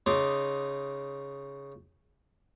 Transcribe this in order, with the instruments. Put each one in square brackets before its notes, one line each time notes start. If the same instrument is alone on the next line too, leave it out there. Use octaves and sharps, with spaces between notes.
[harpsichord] C#3 D#4 A5 C6 D6